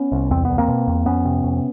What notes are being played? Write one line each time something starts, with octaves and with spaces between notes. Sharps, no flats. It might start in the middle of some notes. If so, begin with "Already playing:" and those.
Already playing: B3 C#4
C2
E2 C4
E2 B3
A#3 C4
B2
E2
F2 B3 C#4
C3
F2